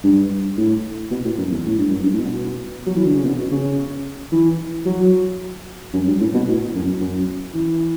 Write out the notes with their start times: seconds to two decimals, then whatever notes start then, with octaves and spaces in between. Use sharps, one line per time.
0.04 G2
0.57 A2
1.11 B2
1.24 A2
1.38 F#2
1.51 E2
1.65 A2
1.78 G2
1.90 F#2
2.03 G2
2.13 A2
2.19 B2
2.87 F#3
2.96 E3
3.05 D3
3.15 C#3
3.25 B2
3.52 C#3
4.32 E3
4.86 F#3
5.94 F#2
6.07 G2
6.20 A2
6.34 B2
6.48 A2
6.74 F#2
7.00 F#2
7.54 E3